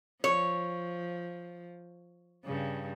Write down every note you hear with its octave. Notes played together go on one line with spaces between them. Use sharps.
F3 C#5
G2 C#3